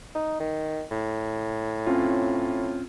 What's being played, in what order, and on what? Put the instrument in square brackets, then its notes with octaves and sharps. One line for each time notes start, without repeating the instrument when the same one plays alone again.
[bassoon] D#4
D#3
A2
[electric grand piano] C4 C#4 F4